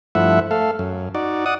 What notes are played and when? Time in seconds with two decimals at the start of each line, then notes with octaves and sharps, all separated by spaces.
0.15 G2 F3 A3 E4 E5 F#5
0.51 A3 A4 F5
0.79 F#2
1.15 D#4 F#4 D5
1.46 D5 F#5 D#6